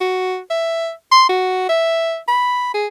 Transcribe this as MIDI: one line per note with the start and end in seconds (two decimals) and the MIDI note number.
0.01 0.39 66
0.51 0.91 76
1.12 1.25 84
1.29 1.64 66
1.69 2.17 76
2.28 2.73 83
2.74 2.87 68